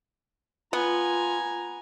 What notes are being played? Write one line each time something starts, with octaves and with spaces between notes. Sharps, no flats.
B3 F4 G#5 A#5